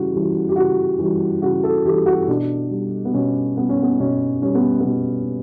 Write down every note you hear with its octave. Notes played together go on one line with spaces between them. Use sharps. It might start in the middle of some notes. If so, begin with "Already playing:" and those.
Already playing: C#3 E3 G3 F#4
E3 G3
G4
C#3 F#4
E3 G3
C#3 F#4
A4
E3 G3 G4
F#4
B2 D4
G3
B3
B2 C#4
G3 B3
C#4
B3
B2 C#4
G3 C#4
B3
B3
B2